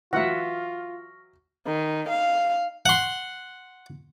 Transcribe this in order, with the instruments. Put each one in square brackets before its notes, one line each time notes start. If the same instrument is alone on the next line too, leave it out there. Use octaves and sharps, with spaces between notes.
[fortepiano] E3 F#3 [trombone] F4 [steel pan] E5 F#5 [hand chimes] C#6 F6 A#6
[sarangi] D#3
F5
[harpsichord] F#5 C6